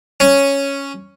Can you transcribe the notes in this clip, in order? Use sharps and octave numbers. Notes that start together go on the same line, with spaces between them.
C#4